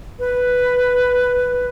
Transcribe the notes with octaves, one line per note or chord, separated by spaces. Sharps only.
B4